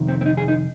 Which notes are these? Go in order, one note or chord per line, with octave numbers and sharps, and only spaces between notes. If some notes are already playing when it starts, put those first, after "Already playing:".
Already playing: F2 C3 D#3
C4
C4
D#4
G#4
D#4